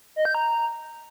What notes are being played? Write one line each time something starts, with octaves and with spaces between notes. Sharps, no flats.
D#5
G6
A#5